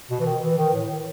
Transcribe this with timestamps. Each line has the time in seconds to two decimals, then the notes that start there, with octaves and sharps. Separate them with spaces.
0.11 B2
0.20 E3
0.26 D#3
0.42 E3
0.58 D#3
0.74 A2